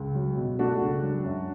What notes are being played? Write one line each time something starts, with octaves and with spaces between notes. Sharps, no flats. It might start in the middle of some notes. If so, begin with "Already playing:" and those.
Already playing: C#2
F#3
B2
A3 D4 F#4
C#2
F#3
F#2